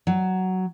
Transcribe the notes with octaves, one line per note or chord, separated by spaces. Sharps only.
F#3